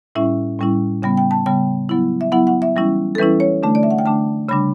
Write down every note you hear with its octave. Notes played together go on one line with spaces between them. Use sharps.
A2 G3 C#4 E4 E5
A2 G3 C#4 E4
C#3 G3 B3 G5
G5
A5
C#3 G3 B3 G5
F#3 B3 E4
E5
F#3 B3 E4 F#5
F#5
E5
E3 G3 C#4 E4
A4
E3 G3 C#4 E4 B4
C#5
D3 A3 D4
D5
E5
F#5
G5
D3 A3 D4 A5
C#3 G3 D4 B5